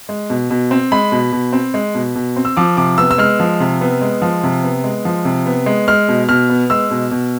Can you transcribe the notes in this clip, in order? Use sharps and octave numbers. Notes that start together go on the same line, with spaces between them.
G#3
B2
B2
C4
G#3 B5
B2
B2
C4
G#3
B2
B2
C4
E6
F3 D6
C3 D6
B3 E6
E6
G#3 F6
F3
C3
B3
G#3
F3
C3
B3
G#3
F3
C3
B3
G#3
G#3 F6
B2
B2 F6
B3
G#3 E6
B2
B2